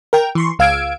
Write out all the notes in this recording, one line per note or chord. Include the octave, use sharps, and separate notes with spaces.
A#4 G5
E3 C6 C#6
C#2 F5 E6 G#6 D7